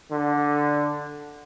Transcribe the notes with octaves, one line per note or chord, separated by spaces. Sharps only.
D3